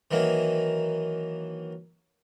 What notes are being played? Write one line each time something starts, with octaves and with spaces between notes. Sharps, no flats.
D#3 E3 F#3 A#3